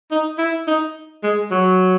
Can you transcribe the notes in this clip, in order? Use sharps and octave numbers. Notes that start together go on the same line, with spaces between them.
D#4
E4
D#4
G#3
F#3